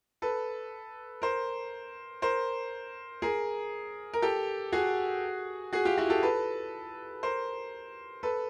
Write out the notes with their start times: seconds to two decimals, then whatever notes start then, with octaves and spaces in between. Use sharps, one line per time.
0.22 A4 B4
1.22 A#4 C5
2.22 A#4 C5
3.22 G#4 A#4
4.14 A#4
4.22 G4 A4
4.72 F#4 G#4
5.73 F#4 G#4
5.85 F4 G4
5.98 E4 F#4
6.10 G4 A4
6.23 A4 B4
7.23 A#4 C5
8.23 A4 B4